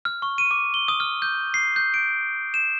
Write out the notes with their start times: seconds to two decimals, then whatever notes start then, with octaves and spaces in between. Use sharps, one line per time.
0.05 F6
0.22 C#6
0.38 D#7
0.51 D6
0.74 G7
0.88 D#6
1.00 F6
1.22 G6
1.54 C7
1.76 G6
1.94 D7
2.54 E7